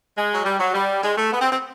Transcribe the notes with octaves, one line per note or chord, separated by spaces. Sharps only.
G#3
F#3
G3
F#3
G3
G#3
A3
B3
C4
C4